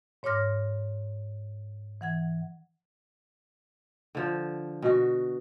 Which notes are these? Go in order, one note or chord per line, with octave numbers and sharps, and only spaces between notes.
G#2 C#5 C6 D6 F6 A#6
E3 F#5 G#6
D3 F3
B2 F#4